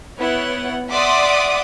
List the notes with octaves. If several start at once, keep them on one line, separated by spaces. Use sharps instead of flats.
B3 E4 C#5 F#5
D5 E5 F#5 C6 D6 D#6